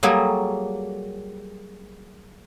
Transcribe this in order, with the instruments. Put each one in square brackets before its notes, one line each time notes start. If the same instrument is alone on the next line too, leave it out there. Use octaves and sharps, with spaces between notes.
[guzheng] F#3 G3 A#3 F#4 G#4 A4